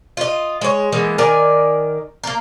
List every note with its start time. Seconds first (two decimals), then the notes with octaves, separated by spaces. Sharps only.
0.17 F4 D#5
0.61 G#3 C#5
0.92 E3 G#3 A#3 B3
1.18 D#3 A#4 D5 G#5
2.24 A#3 A#4